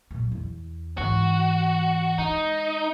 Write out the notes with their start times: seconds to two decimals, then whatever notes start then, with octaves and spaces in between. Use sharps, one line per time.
0.11 A#2 F#3
0.32 E2
0.98 G#2 E3 F#4
2.18 G#3 D#4